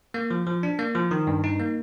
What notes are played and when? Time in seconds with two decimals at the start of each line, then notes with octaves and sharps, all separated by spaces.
0.14 A#3
0.31 F3
0.47 F3
0.63 D4
0.79 A#3
0.95 F3
1.11 D#3
1.27 G2
1.44 D#4
1.59 A#3